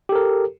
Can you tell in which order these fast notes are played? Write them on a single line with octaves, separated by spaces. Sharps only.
G4 A4 A#4